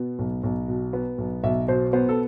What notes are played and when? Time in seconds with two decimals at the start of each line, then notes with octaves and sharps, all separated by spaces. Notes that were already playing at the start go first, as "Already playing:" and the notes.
Already playing: B2 B3
0.19 B1
0.43 B1
0.68 B2
0.93 B3
1.18 B1
1.43 B1 E5
1.68 B2 C5
1.93 B3 C5
2.09 A4